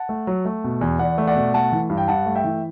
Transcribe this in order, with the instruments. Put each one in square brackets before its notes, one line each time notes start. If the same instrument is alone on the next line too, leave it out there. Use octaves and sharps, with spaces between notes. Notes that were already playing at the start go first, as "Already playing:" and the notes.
Already playing: [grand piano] F#5 A5
A3
F#3
A3
B2
E2
E2 D5 F#5
A3
D5 F#5
B2
A3 F#5 A5
E3
G2
G5
G2 F#5 A5
A3
E5 G5
E3